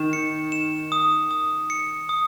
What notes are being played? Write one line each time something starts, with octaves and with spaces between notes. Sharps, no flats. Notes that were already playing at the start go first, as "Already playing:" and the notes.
Already playing: D#3 E7
C#7
E7
D#6
D#6
C#7
D#6